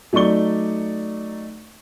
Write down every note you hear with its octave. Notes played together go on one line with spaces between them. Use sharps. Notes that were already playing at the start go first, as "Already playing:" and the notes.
F#3 A3 D#4 D5 C#6 G7